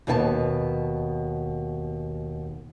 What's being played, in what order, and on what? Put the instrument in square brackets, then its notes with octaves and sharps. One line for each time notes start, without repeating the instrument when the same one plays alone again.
[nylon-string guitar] D#2 B2 D#4 B4 G5 A5